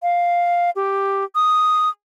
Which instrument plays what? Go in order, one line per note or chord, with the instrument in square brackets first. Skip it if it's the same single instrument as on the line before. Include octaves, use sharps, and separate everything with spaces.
[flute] F5
G4
D#6